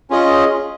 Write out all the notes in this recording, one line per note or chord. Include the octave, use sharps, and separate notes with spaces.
C#4 F4 G#4 D#5